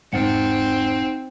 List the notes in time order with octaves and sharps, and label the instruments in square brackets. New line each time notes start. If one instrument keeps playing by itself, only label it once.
[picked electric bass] E1 G#2 G#3 [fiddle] C4 [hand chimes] D#4 F#5 C#7